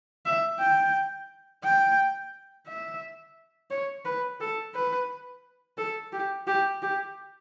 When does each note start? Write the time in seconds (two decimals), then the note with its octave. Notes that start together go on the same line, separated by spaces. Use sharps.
0.26 E5
0.59 G5
1.64 G5
2.68 E5
3.70 C#5
4.05 B4
4.40 A4
4.75 B4
5.78 A4
6.13 G4
6.47 G4
6.82 G4